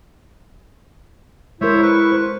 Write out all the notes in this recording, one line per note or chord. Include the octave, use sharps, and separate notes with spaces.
G#3 E4 A#4 C5 C#5 E5
B4 C#6
C5